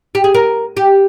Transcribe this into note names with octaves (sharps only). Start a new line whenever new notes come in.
G4
G#4
A#4
G4